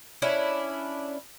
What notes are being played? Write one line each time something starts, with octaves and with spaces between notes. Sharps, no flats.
C#4 D4 E4